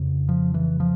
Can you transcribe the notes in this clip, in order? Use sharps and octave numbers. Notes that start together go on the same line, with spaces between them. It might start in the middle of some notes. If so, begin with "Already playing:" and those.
Already playing: F2 C#3
F3
E3
F3